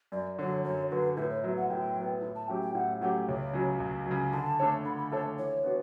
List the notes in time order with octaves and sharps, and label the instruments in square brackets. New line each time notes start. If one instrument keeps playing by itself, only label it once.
[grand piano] F#2 [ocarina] D5
[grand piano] D3 F#3 [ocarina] C#5
[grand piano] F#2 [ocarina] C#5
[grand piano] D3 F#3 [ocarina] B4
[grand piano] A2 [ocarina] B4
[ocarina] C#5
[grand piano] F#3 B3 [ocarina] E5
[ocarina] F#5
[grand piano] A2 [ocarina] G5
[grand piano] F#3 B3
A2
[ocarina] A5
[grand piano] F#3 A3 C#4 G4 [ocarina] G5
[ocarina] G5
[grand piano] A2 [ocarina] F#5
[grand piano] F#3 A3 C#4 G4 [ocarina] F#5
[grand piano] C#2 [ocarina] C#5
[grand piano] C#3 F#3
C#2
C#3 F#3
[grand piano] D3 [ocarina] A5
[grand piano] A3 D4 A4 C#5
[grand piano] D3 [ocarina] B5
[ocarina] B5
[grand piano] A3 D4 A4 C#5 [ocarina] A5
[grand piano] E3 [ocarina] C#5
[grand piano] B3 D4 F#4